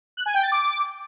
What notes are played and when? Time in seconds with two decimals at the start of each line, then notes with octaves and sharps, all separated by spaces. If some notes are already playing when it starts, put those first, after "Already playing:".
0.17 F#6
0.26 G#5
0.34 G5
0.43 A6
0.52 D6